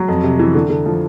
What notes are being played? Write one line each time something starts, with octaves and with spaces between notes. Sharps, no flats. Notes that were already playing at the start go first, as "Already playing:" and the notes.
Already playing: F#3
F2
C3
E3
D3
D3
F3